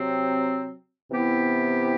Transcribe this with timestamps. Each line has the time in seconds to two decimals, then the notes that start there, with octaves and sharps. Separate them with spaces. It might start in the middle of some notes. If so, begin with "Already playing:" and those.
Already playing: C3 F#3 C4
1.10 C3 E3 B3 E4 G4